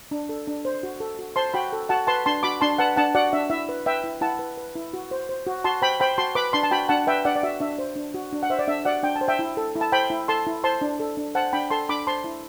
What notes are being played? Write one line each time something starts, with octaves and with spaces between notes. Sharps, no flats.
D4
A4
D4
C5
F#4
A4
F#4
C5 A5 C6
F#4 G5 B5
A4
F#4 F#5 A5
B4 A5 C6
D4 A5 C6
F#4 B5 D6
D4 A5 C6
B4 F#5 A5
D4 F#5 A5
F#4 D5 F#5
D4 E5
E4 E5
B4
B4 E5 G5
E4
E4 F#5 A5
B4
B4
E4
F#4
C5
C5
F#4
F#4 A5 C6
C5 G5 B5
C5 G5 B5
F#4 A5 C6
B4 B5 D6
D4 A5 C6
A5
F#4 G5 B5
D4 F#5 A5
B4 E5 G5
D4 D5 F#5
D5
F#4 E5
D4 E5
C5
D4
F#4
D4
F#5
C5 E5
D5
D4 E5
F#4 D5 F#5
D4 G5
A5
C5
E5 G5
E4
A4
E4
A5
C5 G5 B5
E4
A4 A5 C6
E4
C5 A5 C6
D4
A4
D4
C5 F#5 A5
D4 G5 B5
A4 A5 C6
D4 B5 D6
C5 A5 C6
E4